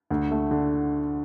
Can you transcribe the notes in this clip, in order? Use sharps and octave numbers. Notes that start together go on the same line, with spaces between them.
D2
A3
D3